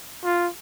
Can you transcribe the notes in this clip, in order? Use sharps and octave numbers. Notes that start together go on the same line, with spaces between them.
F4